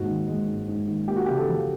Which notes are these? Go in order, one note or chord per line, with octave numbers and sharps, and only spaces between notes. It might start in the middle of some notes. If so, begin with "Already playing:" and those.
Already playing: D#2 G#2 F#4
D#3
G#3
G#2
G#2
D#3
A#3 G4
F#4
C#3 G4
A4
F3